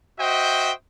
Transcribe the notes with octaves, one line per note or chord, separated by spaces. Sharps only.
F#4 C5 D#5 E5 G5